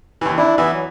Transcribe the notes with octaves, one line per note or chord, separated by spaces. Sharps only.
D#2 E3
D4 E4
E3 B3 E5
F#3